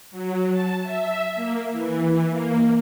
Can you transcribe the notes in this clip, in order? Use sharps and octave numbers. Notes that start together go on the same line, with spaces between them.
F#3
A5
E5
A#3
E3
A#3